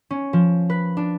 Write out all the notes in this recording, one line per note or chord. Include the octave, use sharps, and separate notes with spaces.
C#4
F3
B4
D4